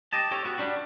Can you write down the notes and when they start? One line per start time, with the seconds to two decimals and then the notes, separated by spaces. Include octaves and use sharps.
0.13 G4 D#5 A5
0.31 G4 A4 C#5
0.45 B3 F#4
0.58 G3 D4 F#4